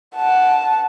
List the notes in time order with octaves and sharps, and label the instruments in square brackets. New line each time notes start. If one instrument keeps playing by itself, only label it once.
[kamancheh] F#5 A5